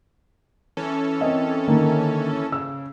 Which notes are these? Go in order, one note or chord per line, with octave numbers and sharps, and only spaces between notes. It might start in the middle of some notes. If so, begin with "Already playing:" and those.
E3 C#4 A4
C4 A#4 D#5
D3 D#3 A#3
C#3 E6